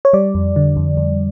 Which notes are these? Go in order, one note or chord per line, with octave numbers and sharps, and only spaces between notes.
C#5
G3 D5
F2
D3
F2
F2